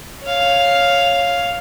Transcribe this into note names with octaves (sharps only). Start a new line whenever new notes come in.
C#5 F5